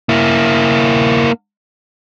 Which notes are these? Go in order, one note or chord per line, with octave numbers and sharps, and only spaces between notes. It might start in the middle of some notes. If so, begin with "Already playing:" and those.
A#3 E4